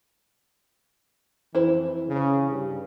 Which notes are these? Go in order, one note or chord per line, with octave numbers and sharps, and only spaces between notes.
F2 E3 E4 C5
C#3
G2